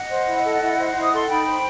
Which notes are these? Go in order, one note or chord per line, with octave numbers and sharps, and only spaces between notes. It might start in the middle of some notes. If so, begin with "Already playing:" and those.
Already playing: D#5 F#5
C5
E4
A4
E4
C5
E4
D#6
A4 C6
D#4 G5 B5
C5